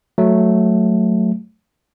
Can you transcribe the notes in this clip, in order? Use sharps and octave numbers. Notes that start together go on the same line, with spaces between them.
F#3 A3